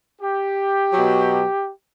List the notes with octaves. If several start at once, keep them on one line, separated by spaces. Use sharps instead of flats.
G4
B2 F#3